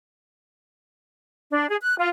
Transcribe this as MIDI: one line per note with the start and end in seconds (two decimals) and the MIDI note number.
1.51 1.68 62
1.69 1.76 68
1.81 1.95 90
1.99 2.08 65